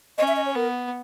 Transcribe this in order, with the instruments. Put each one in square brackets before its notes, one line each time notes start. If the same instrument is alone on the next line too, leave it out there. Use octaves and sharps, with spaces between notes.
[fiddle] C#4 [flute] D#5
[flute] E5
D#5
C#5
[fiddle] B3 [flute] A#4